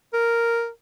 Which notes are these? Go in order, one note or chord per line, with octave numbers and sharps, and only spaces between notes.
A#4